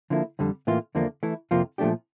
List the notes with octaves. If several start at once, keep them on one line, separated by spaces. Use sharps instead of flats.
D3 F3 A#3 E4
F2 D3 G3
A2 E3 A#3 F4
E2 D3 F3 A#3 D4
E3 A3 E4
F2 C3 F3 A#3 F4
A#2 F3 A3 D4 G4